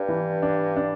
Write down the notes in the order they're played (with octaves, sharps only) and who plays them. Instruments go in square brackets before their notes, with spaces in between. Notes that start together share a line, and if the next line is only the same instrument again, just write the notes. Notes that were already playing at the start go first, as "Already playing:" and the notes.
Already playing: [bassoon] G2 [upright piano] D4
[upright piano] E3
D4
D4